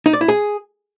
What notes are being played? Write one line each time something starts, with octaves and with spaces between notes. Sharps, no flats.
D#4
D5
E4
G#4